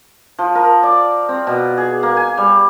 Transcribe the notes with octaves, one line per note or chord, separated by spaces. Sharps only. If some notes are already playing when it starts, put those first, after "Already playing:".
F3
A#4
D5
C4
B2
G#4
A#3
G#5
G3